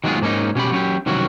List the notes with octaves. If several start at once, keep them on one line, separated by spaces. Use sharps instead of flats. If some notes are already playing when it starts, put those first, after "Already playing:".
D#3 F#3 G#3 B3 F4 G#4
G#2 A#3 C#4 D#4
B2 C#4 G4 B5
F#3 C#4 G4
C2 D#3 E3 F#3 C#4 F#4